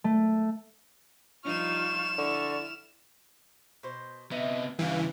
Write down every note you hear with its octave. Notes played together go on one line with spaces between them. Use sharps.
A3
F3 G3 D#4 F4 C#6 F6 E7
D3 E4 D5 C#6
B2 C5
C3 B3 D#4 E5
G2 C#3 E3 G4 F5 G#5